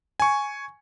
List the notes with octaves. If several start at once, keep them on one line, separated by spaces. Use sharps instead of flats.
G#5 C#6